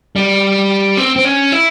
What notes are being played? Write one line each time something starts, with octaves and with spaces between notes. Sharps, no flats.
G3
C4
C4
C#4
E4